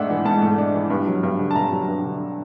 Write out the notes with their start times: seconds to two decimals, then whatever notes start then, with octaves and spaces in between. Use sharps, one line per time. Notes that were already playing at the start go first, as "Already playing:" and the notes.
Already playing: G#2 A3 D4 E5 F#5
0.10 E3
0.25 G#2 A5
0.42 A3
0.58 D4
0.74 E3
0.90 G2
1.07 F#3
1.23 G2
1.39 D3
1.51 A5
1.56 G2 A#5
1.72 F#3
1.88 G2
2.04 D3